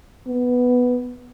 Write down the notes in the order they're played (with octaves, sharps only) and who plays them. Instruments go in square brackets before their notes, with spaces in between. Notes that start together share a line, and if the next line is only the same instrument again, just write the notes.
[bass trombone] B3